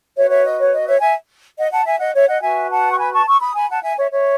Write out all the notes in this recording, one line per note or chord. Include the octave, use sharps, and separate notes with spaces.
F#4 B4 C#5 E5
C#5 E5
D#5
C#5
D#5
C#5 E5
E5 G#5
D#5 F#5
F#5 A5
E5 G#5
D#5 F#5
C#5 E5
D#5 F#5
F#4 B4 E5 G#5
F#5 A5
C#6
G#5 B5
A5 C#6
C#6 E6
B5 D#6
G#5 B5
F#5 A5
E5 G#5
C#5 E5
C#5 E5